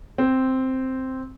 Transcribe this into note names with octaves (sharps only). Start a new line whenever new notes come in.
C4